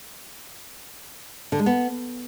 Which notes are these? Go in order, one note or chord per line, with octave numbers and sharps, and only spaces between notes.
D3
G#3
B3